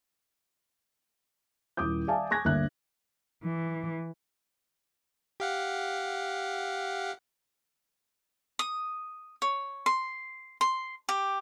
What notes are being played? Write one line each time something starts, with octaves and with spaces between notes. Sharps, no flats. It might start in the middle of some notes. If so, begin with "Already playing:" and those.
D#1 E4 D6 D#6 G6
D5 E5 F5 G#5 A5
G#5 C#6 F#6 G#6 A#6
G1 D2 D3 A#3 E5 F#6
E3
G4 F5 F#5
D#6
C#5
C6
C6
G4